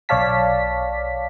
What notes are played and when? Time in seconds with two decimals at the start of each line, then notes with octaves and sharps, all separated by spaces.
0.09 B1 C#5 D5 F5 A5 B6